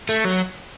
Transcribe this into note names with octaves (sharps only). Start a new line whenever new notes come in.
A3
F#3